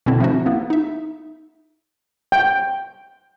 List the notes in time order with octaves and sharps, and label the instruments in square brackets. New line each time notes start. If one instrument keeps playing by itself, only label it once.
[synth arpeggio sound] B2 D3 C4 E4
F3 A3 C#4 D#4 F#4
A#3 B3 E4
D#4 E5
[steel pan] G5